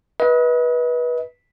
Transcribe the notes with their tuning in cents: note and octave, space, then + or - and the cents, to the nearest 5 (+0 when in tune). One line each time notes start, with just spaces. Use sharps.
B4 -20 D#5 +35